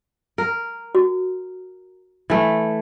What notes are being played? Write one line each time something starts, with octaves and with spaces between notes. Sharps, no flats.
A#4
F#4
E3 A3